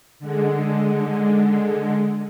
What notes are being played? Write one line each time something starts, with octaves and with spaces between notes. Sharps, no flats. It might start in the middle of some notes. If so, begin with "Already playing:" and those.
D3 G#3